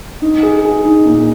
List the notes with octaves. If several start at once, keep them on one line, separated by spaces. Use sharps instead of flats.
D#4
G#4
G#4
D#4
A#2